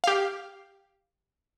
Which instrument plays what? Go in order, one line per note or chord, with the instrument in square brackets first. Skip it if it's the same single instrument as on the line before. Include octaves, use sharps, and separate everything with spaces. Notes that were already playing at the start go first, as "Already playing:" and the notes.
[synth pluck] G4 F5